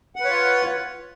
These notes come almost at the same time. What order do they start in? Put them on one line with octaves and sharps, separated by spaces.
F#5 B4 C#5 F4